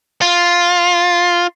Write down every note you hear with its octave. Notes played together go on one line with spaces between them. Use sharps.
F4